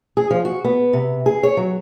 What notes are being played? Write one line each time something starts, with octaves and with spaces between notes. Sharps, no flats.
G#4
F3
F#4
B3
C3
G#4
C#5
F#3